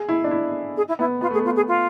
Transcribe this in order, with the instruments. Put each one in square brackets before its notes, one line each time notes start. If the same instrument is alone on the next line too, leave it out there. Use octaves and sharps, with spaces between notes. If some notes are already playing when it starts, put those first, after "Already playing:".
Already playing: [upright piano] G#4
E4
D4
E4
[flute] G#4
E4
[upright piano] B3 [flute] E4
[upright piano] B3 [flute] F4
[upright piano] A3 [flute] G#4
[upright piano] B3
[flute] F4
G#4
F4